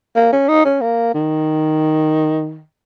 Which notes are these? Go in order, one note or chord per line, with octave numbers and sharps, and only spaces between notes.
A#3
C#4
D#4
C#4
A#3
D#3